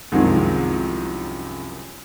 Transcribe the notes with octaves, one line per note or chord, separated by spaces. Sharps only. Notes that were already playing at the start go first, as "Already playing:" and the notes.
C2 F#2 D#3 F3 G#3